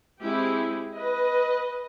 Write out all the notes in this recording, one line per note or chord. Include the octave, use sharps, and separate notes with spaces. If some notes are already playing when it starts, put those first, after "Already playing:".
G#3 C4 E4 G4
B4 D#5